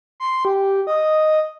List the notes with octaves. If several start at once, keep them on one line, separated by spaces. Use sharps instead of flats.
C6
G4
D#5